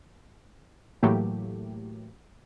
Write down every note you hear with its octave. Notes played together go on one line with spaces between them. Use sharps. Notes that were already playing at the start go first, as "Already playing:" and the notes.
A2 E3 F#3 A3 A#3 G4